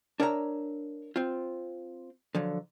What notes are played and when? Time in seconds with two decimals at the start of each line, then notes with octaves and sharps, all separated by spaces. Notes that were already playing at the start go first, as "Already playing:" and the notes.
0.20 D4 A#4 C#5 E5 F#5 A#5
1.16 C4 F4
2.35 D3 F3 F#3